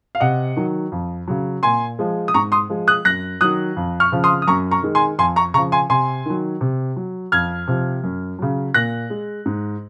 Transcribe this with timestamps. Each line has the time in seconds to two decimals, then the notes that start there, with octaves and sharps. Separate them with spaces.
0.15 F5
0.20 C3 D#5 F#5
0.56 D#3 F#3
0.92 F2
1.28 C#3 F#3
1.63 A#2 G#5 C6
1.99 F3 G#3
2.28 D#6
2.34 G#2 A#5 C#6
2.52 C6 D#6
2.70 F3 G#3
2.88 D#6 F#6
3.05 F#2 F#6 A#6
3.41 D#3 F#3 D#6 F#6
3.77 F2
4.00 C#6 F6
4.12 C#3 F3
4.24 C6 D#6
4.42 D#6
4.47 F#2 A#5 C#6
4.71 A#5 C#6
4.83 D#3 G#3
4.95 G#5 C6
5.18 F2 G#5 C6
5.36 A#5 C#6
5.54 C#3 A#5 C#6
5.58 F3
5.72 G#5 C6
5.90 C3 G#5 C6
6.26 D#3 F#3
6.61 C3
6.96 F#3
7.32 F2 F6 G#6
7.67 C3 F3
8.03 F#2
8.39 C#3 F#3
8.74 A#2 F#6 A#6
9.10 G#3
9.46 G#2